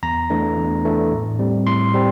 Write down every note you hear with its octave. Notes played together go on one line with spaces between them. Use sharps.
E2 A#5
E3 A3 D4
E2
E3 A3 D4
A2
G3 C4
A2 C6
G3 C4